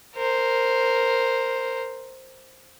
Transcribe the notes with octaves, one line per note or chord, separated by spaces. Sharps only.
A#4 C5